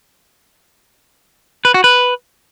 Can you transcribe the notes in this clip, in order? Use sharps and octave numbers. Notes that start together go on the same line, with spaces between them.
B4
F#4
B4